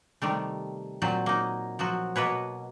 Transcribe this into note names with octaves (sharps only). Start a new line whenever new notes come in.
C3 D#3 G3 A3
A#2 F#3 C4
A#3 D#4
F3 F#3 F#4
B2 A#3 B4 C#5